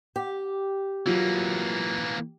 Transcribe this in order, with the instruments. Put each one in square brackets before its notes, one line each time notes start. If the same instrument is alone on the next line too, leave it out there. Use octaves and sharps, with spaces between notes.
[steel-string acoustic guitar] G4
[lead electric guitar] E3 A#3 [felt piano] F#3 F4